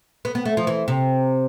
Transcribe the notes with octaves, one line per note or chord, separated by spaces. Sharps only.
B3
B3
A3
F3
E3
C3